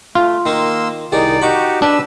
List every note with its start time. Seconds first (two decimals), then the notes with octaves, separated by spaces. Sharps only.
0.15 A3 F4
0.46 D#3 A#3 D#4 C6 E6
1.12 C2 D#3 D#4 G#4 D5
1.42 D#4 F#4 G4 B5 C#6 D6
1.82 D4 B4 E6